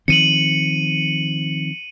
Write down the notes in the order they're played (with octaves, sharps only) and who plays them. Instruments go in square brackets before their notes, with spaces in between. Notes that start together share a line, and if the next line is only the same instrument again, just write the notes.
[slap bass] D#3 F3 C4 [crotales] C#7 D#7 F#7